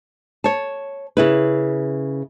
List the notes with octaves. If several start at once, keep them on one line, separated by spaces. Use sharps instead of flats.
C#5 A5
C#3 E4 B4